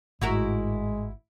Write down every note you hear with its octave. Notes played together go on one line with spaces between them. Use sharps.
G#1 A2 G#3 E4 F#4 A#4